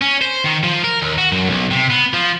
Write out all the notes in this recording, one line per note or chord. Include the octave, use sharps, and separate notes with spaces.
C#4
C5
D#3
F3
A#4
D#2
F#4
F#2
B1
C3
B3
F3